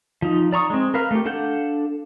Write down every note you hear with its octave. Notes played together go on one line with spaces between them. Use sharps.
F3 D#4
D5 A#5 C#6 D#6
G#3 C4
A#4 B4 F5
A3 G4
D4 A4 F5 F#5 G6